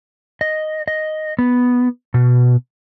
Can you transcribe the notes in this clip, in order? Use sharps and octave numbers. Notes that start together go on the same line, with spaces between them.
D#5
D#5
B3
B2